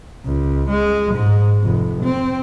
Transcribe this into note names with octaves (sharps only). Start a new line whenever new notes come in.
C#2
G#3
G#2
F1
C4